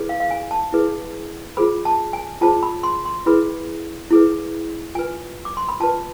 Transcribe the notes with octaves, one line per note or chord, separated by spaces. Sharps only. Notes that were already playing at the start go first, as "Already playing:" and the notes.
Already playing: E4 G#4 B4
F5
F5
G#5
A5
E4 G#4 B4
F4 G#4 C5 B5
A5
G#5
F4 G#4 C5 A5
B5
C6
C6
E4 G#4 B4 B5
E4 G#4 B4
F4 B4 G#5
D6
C6
B5
F4 B4 A5